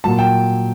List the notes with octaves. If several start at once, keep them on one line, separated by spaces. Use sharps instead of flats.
A#2 F#3 A5
G5